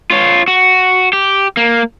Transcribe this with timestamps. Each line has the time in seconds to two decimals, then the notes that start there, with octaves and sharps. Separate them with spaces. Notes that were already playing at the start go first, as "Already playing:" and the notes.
0.10 F4 C#5
0.48 F#4
1.13 G4
1.57 A#3